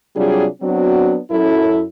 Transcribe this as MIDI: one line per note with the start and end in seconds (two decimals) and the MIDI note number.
0.16 0.46 48
0.16 0.46 54
0.16 0.46 55
0.16 0.46 62
0.16 0.46 65
0.16 0.46 68
0.62 1.17 54
0.62 1.17 59
0.62 1.17 60
0.62 1.17 62
0.62 1.17 66
1.30 1.82 42
1.30 1.82 64
1.30 1.82 69